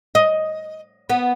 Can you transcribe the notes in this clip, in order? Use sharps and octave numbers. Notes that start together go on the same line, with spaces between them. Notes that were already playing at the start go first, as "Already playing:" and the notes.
D#5
B3